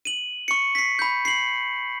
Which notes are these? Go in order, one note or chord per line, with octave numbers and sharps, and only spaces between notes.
D#7 F#7
C#6 C#7
B6 C7
B5 G6
C7 F#7